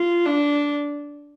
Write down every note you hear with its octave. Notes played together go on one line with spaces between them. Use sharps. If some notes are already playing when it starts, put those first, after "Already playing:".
Already playing: F4
D4